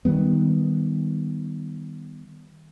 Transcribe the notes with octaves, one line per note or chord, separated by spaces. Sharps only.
D#3 F3 G3 B3